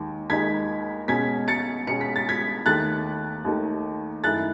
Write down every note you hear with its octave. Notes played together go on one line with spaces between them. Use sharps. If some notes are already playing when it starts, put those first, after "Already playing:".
Already playing: D#2 D#3 G#3
D#2 D#3 G#3 D#4 G#6 B6
B2 G#3 C#4 G#6 B6
A6 C#7
B2 G#3 C#4 C#7
B6
A6
G#6 B6
D#2 D#3 A3 F#6 A6
D#2 D#3 A3
F#2 D#3 A3 E4 F#6 A6